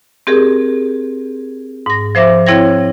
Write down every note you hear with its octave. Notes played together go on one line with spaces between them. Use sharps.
C4 G4 G#4 A#4
G#2 A#6
F3 C5 E5 D6 A#6
C4 E4 C#5 G5 G#6 A#6